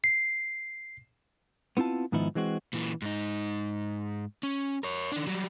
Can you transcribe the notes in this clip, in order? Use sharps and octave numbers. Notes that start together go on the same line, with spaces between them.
C7
B3 C4 E4 F4 A5
G#2 D#3 F3 B3 D#4 E4
E3 G#3 C4 F#4
A#2 E3
G#2 D#4
C#4
A#4 C#5
D#3 D4
F#3 G3